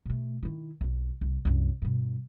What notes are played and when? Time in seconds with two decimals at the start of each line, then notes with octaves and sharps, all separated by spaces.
0.06 B2 A3
0.43 D#3 E4
0.81 B1 F2
1.21 C2
1.45 C2 F#2
1.82 G2 B2